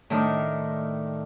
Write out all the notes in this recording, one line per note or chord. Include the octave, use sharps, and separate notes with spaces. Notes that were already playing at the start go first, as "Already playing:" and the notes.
A2 D#3 A3 D4 D#4